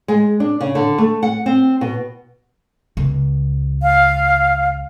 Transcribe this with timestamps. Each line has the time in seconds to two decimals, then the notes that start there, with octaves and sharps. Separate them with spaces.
0.08 G#3
0.40 D4
0.60 C#3
0.75 D3
0.98 A3
1.23 F#5
1.46 C4
1.81 B2
2.97 C#2
3.83 F5